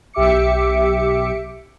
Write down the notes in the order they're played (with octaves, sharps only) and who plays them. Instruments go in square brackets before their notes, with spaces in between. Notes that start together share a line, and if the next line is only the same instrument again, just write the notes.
[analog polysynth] B1 G4 E5 D6 C#7